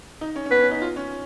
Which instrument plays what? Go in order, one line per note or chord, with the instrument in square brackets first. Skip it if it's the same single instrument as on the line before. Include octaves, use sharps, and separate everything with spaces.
[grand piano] D#4
C#4
C#4
[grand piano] B3 [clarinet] B4
[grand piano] C#4
D#4
F4
C#4